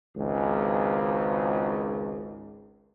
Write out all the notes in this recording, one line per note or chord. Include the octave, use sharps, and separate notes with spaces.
G#1 C#2